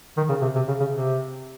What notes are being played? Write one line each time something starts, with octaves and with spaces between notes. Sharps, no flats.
D#3
C#3
C3
C3
C#3
C#3
C3